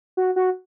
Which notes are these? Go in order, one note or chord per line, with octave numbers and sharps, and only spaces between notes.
F#4
F#4